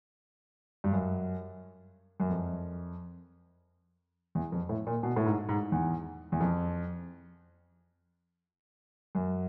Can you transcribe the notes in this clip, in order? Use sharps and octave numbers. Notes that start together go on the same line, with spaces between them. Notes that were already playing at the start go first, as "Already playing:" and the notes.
G2
F#2
F#2
F2
E2
F2
A2
A#2
B2
A2
G#2
G#2
E2
E2
F2
F#2